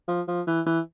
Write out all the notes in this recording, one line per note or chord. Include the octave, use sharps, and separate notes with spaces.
F3
F3
E3
E3